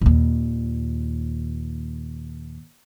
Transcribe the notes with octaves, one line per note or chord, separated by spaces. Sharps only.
D#2 A#2